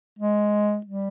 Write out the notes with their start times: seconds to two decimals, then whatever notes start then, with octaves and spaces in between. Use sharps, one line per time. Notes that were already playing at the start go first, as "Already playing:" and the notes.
0.19 G#3
0.86 G3